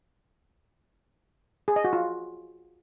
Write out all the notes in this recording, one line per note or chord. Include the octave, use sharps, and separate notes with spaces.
G#4
D#5
F#4
F4